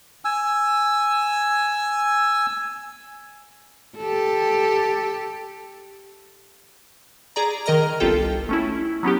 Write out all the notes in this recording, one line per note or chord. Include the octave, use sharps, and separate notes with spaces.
G#5 E6
G4 A4
G#4 D5 A#5
D#3 A#4 D#5 A#5 F6
G1 C2 F4 G4 A4 G5
A3 C#4 E4
F#3 B3 C#4 G4